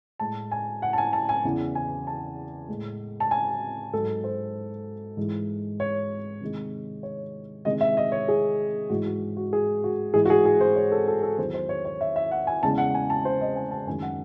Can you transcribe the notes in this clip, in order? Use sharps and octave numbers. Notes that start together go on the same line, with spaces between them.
A2 G#3 A5
G#5
F#5
A5
G#5
A5
G#5
E2 C#3 E3
G#5
A5
A2 G#3
A5
G#5
G#2 F#3 A4
C5
G#2 E3 G#3
C#5
C3 D#3 G#3
C#5
C3 D#3 G#3 D#5
E5
D#5
C#5
G#4
G#2 E3 G#3 F#4
F#4
F#4
G#4
F#4
G#2 E3 G#3 G#4
F#4
G#4
G#4
C5
C#5
A4
A4
A4
E2 D#3 F#3 C5
C5
C#5
C#5
E5
E5
F#5
G#5
E2 C#3 G#3 A5
F#5
G#5
A5
C5
D#5
G#5
A5
F#2 D#3 G#3 G#5
F#5